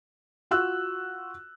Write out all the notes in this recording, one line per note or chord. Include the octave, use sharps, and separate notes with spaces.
F4 F#4 E6 F#6